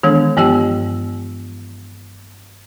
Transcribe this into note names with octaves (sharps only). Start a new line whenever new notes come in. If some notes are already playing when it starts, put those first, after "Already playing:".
D#3 E3 G#3 B3 D4 A4
G2 F3 B3 G4 G5 E6